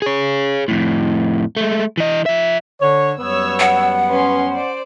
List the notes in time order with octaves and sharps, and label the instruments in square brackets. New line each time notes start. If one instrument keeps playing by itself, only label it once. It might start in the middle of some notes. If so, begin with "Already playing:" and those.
[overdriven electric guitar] G#4 C#5
F2 A2
G#3 A3
E3 D#5
F3 E5
[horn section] D3 C#5
[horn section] F#2 G3 B3 [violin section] C#5 E6
[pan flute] F#5
[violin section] C#4 B4 C6
C5 D5